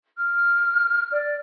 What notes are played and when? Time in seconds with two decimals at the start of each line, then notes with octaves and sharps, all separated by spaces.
0.17 F6
1.12 D5